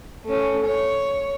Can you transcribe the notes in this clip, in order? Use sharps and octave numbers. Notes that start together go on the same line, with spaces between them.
A3 C#4
C#5